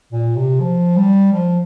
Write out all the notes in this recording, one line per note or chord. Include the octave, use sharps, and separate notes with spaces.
A#2
C3
F3
G3
F3